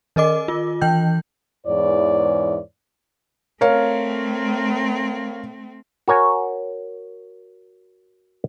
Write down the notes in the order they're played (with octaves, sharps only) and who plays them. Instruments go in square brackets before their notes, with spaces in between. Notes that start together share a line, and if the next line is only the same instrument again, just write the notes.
[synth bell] D#3 A#4 D#5 D6
F4
E3 G5 G6
[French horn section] E2 G#2 E3 E4 C#5 D5
[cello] A3 C4 [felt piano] A#4 C#5 F5
[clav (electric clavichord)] F#4 A#4 C#5 G#5